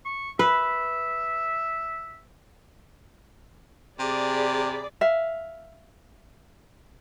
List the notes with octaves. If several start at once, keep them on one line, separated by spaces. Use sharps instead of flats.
C#6
B4 E5
C3 G#4 D5 B5
E5 F5